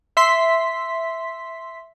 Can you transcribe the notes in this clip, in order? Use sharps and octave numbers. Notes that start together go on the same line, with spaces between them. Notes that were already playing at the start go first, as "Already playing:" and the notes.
E5 C6 B6